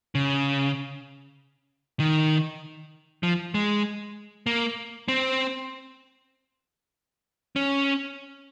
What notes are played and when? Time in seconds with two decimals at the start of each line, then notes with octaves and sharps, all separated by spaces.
0.15 C#3
2.00 D#3
3.23 F3
3.54 G#3
4.46 A#3
5.08 C4
7.56 C#4